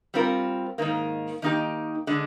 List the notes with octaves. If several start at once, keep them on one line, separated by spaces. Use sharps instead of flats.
G3 C4 F4 A#4
G#2 D#3 A#3
D#3 A#3 D#4 G4
D3 G#3